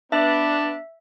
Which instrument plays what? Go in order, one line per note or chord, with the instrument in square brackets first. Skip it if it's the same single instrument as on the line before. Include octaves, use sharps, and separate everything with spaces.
[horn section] B3 D4 [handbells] E5